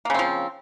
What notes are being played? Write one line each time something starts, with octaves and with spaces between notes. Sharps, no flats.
C#3 F3 A#3 C4